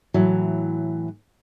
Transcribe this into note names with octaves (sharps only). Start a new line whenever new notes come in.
A2 E3 F#3